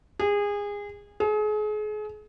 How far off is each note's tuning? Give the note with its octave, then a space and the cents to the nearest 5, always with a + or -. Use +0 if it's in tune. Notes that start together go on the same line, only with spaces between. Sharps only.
G#4 -25
G#4 +35